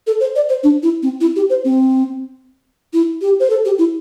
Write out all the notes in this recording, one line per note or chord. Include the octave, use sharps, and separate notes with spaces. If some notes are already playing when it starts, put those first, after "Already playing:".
A4
C5
D5
C5
D4
E4
C4
E4
G4
C5
C4
E4
G4
C5
A4
G4
E4